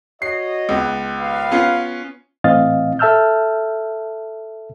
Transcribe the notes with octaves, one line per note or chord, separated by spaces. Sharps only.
F#4 C#5 D#5 C7
C#2 B3
D#2 B4 F5
B3 C#4 F4
A2 E3 C4 D#5 F5 A6
A4 E5 A5 E6 F6 G6